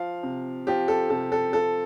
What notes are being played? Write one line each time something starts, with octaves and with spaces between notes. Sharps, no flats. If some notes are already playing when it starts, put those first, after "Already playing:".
Already playing: F3 F5
C3
F3 G4
A4
C3 A4
A4
F3 A4